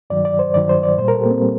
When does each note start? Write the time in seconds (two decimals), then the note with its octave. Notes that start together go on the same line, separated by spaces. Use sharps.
0.10 G2 D#3 F#3 D5
0.25 D5
0.39 C5
0.54 G2 D#3 F#3 D5
0.69 C5
0.83 D5
0.98 A#2 G3 C5
1.08 A#4
1.15 A4
1.20 G4
1.25 A#3
1.31 C4
1.41 G3